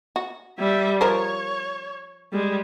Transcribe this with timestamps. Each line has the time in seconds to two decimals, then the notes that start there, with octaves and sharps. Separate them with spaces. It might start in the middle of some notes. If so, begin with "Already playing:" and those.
0.16 F#4
0.59 G3 E5
1.01 F3 A#4 C5 C#5
2.32 G3 G#3